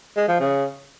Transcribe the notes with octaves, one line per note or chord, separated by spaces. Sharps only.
G#3
F3
C#3